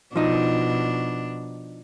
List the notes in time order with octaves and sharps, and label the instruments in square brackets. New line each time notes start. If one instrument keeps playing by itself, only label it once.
[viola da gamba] B2 D4 [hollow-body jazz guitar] F3 D#4